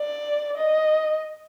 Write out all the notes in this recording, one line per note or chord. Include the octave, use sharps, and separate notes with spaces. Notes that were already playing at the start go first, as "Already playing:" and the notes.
Already playing: D5
D#5